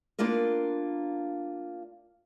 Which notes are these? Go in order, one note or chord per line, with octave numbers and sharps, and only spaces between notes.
A#3 B3 D4 F4 A#4